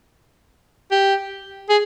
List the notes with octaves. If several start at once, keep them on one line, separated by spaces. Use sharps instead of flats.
G4
G#4